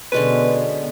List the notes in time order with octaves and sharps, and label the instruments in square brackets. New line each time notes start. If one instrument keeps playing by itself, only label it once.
[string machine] B2 B3 [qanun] D3 G#3 C#4 [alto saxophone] B4